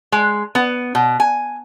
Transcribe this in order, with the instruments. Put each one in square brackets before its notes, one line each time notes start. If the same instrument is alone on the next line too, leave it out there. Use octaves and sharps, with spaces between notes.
[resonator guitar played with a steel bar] G#3
B3
B2
G#5